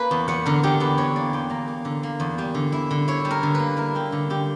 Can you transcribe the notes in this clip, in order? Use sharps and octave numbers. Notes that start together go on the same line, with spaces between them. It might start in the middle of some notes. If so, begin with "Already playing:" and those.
Already playing: A#3 B4
E2
E2 F#5
D3 A#4
D3 G4
E2 B4
D3 C#5
A#3 D5
E2 G5
A#3 A#5
A#3
D3
A#3
E2
G3
D3
E4
D3
E4 C#5
G3
A#4
D3
A#3 B4
E4 A#4
A#3 G4
D3
D3 G4